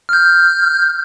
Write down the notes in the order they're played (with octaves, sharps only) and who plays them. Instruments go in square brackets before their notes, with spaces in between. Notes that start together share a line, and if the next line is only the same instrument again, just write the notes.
[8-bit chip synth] F6 G6